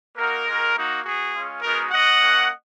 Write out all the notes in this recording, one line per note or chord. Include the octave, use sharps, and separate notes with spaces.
A#3 D#4 F#4 A#4
G#3 D#4 F#4
A#3 D#4 F#4
B3 F#4 G#4
G#3 C#4 F4
G#3 B3 D#4 F#4 A#4
B3 F#4 D#5 F#5
A#3 C#4 F#4